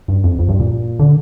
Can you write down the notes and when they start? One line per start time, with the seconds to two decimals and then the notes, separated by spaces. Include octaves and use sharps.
0.08 G2
0.24 F2
0.39 F2
0.49 G2
0.60 A#2
0.99 D3